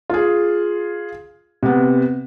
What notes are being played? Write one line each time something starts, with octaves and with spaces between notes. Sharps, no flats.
F4 G#4
C3 B3